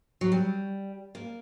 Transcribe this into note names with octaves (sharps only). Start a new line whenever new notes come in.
F#3
G3
A#3